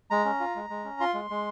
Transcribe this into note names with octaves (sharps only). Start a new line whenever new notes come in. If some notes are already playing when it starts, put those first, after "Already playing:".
G#3 A#5
C#4
F4
G#3
G#3
C#4
F4 C6
G#3
G#3